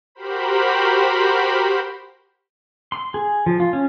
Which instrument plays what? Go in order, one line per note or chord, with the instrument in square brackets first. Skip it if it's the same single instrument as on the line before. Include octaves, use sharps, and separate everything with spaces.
[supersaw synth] F#4 G4 A#4 C5 B5
[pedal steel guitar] C6
G#4
F3
F4
C#4